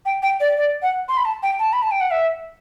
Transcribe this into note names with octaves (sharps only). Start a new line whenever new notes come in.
G5
G5
D5
D5
F#5
C6
B5
A5
G5
A5
B5
A5
G5
F#5
E5